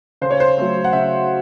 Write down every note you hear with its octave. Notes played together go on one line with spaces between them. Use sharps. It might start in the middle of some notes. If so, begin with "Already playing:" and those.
C#3 C5
C#5
C5
F#3 A3 C4
F#5
C#3 E5